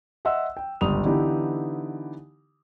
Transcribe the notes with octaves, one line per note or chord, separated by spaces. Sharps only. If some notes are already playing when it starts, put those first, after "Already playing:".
D#5 E5 F#5 C6 E6
G5
G1 C#2 G4 D#6 F7
D3 E3 B3 D#4 E4 G4